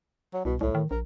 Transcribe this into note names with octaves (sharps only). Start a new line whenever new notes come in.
F#3
C2 B2
C2 A2
D#3
A#1 A#4